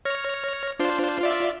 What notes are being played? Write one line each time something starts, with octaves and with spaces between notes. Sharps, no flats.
C#5 F6 A#6
D4 F4 C5
F4 D5 E5